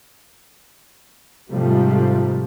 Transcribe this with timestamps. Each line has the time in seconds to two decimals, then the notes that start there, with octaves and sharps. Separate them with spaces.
1.51 G#2 C3 F3 G3 A3